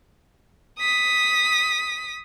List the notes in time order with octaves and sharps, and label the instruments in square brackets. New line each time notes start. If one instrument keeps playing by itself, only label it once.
[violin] D#6 B6